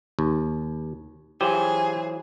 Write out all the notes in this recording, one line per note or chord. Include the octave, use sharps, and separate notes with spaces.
D#2
E3 F#3 G4 G#4 C5